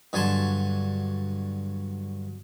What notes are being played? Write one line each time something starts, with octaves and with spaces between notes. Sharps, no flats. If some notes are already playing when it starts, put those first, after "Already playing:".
G2 D3 F#3 G#5 A5 C6